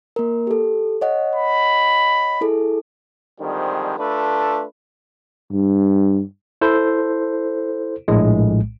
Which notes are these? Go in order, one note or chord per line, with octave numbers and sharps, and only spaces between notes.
A#3 A#4
G4 A4
C#5 D#5 F#5
B5
E4 G#4 A4
D3 D#3 F3 G3 G#3 C4
A3 D4 F4 A4 B4
G2
E4 A4 C5
A#1 A2 G#3